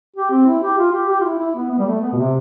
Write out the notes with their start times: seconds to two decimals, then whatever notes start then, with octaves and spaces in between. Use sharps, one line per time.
0.16 G4
0.31 C4
0.47 E4
0.63 G4
0.78 F4
0.93 G4
1.09 G4
1.21 F4
1.25 E4
1.40 E4
1.55 B3
1.71 B3
1.79 G3
1.86 A3
2.01 B3
2.13 B2
2.17 C3